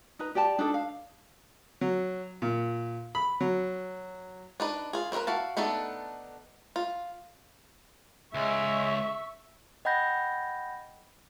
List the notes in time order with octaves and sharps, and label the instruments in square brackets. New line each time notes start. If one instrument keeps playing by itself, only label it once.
[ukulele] D#4 B4 A#5
G4 D5 G5 A5
D4 D#4 A4
F5
[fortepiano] F#3
A#2
B5
F#3
[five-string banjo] D4 D#4 B4
F4 G#4
C4 C#4 E4 A#4 B4
E4 F#4 F5 A5
A3 B3 D4 D#4 A4
F4
[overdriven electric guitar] C#2 [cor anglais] G#3 [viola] E5 C#6
[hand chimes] D#5 F#5 G5 B5 G6 A#6